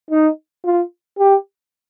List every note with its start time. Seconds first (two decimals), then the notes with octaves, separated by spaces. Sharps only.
0.11 D#4
0.65 F4
1.19 G4